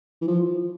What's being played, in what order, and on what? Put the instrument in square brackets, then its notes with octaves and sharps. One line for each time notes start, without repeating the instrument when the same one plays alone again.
[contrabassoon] E3
F3